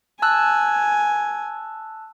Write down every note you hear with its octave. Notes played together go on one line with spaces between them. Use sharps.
G#5 A5 E6 F#6